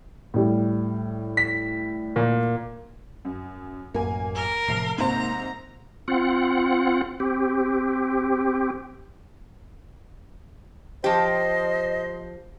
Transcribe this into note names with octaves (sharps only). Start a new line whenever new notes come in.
A2 G3
B6
A#2
F#2
A1 F#2 A#3 G#5
A#4
A2 C3 F3 C7
G#2 C3 A#3 C5 A#5
C4 F4 F#5
C4 G4
F3 G4 C5 D#5